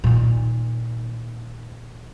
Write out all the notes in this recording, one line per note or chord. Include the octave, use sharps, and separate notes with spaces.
A#2 D#3